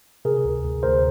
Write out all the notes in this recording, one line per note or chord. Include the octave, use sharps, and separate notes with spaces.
C3 G#4 A#4
D2
D2
D2 A#4 C5